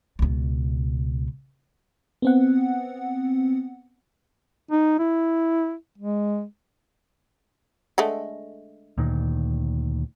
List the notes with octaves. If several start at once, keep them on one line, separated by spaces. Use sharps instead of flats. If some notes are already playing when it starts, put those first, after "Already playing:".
C#2 B2
B3 C4 F#5
D#4
E4
G#3
D3 G#3 A3
D2 A#2 D#3